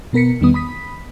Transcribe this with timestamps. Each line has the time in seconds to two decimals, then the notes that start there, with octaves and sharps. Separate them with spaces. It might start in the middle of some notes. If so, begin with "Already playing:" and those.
0.13 B2 B3 A#4 B6 C#7
0.41 E2 D#3 G3 B3 D#6
0.54 B5 D#6 B6